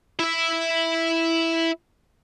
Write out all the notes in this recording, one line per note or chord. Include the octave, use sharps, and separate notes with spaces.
E4 E5